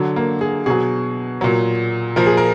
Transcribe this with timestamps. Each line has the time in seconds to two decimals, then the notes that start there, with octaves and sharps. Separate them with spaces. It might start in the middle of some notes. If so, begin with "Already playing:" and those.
Already playing: D3 F#3
0.16 A#3
0.41 G#4
0.66 B2 F#3 G#4
1.41 A#2 F#3
2.16 A#2 F3 A#4
2.26 G#4
2.37 A#4